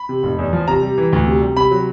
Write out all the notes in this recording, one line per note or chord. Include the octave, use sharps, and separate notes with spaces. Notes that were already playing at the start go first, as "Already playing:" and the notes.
Already playing: B5
C3
F1
E2
F3
C3 A#5
G3
E3
D2
C3
G3
C3 B5
F#3